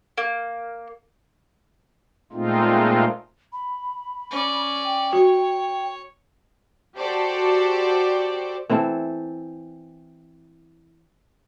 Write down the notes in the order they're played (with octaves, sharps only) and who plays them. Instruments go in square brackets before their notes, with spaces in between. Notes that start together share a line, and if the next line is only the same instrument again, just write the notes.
[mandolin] A#3
[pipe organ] A#2 G#3 A3 C4 D#4 F4
[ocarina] B5
[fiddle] C#4 D5
[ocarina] G5
[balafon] F#4 [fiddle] C#5
[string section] F#4 G4 A4 C5 D5
[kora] E3 C4 E4 A4